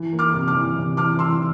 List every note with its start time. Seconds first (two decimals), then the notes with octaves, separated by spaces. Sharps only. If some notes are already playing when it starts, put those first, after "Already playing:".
Already playing: E3
0.13 A#3
0.19 D6 F6
0.33 C3
0.48 D6 F6
0.55 E3
0.77 C3
0.97 E3 D6 F6
1.19 E3 C6 E6